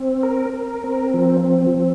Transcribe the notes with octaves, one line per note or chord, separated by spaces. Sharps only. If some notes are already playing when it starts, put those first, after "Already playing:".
Already playing: C4
A#4
A#4
C4
F3
C4
F3